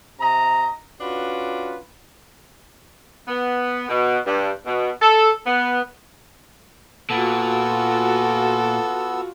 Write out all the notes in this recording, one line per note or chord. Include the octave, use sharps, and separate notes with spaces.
C3 D#5 A#5
C#4 D4 F4 F#4 B4
B3
B2
G2
B2
A4
B3
A#2 B3 F4 F#4 A4 E6